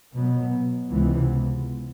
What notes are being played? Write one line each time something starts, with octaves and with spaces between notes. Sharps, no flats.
B2 F#3 B3
C#2 C3 E3 G#3 B3